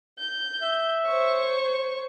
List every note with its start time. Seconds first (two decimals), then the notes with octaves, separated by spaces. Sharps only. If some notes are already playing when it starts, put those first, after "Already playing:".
0.17 G6
0.62 E5
1.05 C5 C#5 C#6